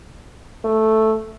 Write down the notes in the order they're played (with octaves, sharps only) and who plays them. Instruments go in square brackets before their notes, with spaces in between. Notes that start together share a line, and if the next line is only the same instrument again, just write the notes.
[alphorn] A3